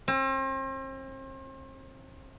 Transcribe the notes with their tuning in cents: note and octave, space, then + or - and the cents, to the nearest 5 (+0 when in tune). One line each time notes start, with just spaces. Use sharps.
C4 +40